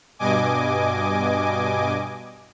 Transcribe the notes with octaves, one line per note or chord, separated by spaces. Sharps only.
G2 B2 D#5 G#5 D6